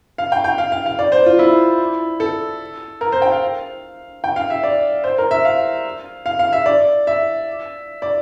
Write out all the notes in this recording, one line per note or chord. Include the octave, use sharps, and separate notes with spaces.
F5
G5
G5
F5
F5
F5
D5
C5
F4
E4
A4
A#4
C5
G5
F5
G5
F5
E5
D5
C5
A#4
E5
F5
F5
F5
E5
D5
E5
D5